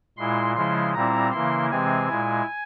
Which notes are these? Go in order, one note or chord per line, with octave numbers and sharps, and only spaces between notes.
A#2 G#3 E4 C6
C#3 F3 G#3 E4 C6
A#2 G3 C4 E4 A#5
C#3 E3 A#3 E4 C6
C3 E3 G#3 C4 G#5
A#2 G#3 E4